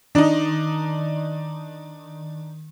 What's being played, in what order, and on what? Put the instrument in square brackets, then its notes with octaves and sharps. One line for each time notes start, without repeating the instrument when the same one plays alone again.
[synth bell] D#3 [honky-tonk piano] D4 D#4